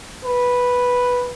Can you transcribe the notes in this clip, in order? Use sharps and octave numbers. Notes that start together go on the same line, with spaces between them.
B4